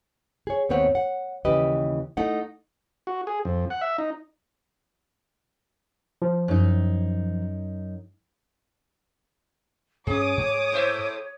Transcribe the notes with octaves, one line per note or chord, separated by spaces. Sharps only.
G#4 C#5
D#2 G#2 B3 C4 C#5 F#5
F#5
D#2 C#3 E3 G4 B4 D#5
A3 D#4 E4 F#5
F#4
G#4
F2
F#5
E5
D#4
F3
F#2 D#4
G2 C#4 G#4 C#5 D6 D#6
G#2
A2 C5 E5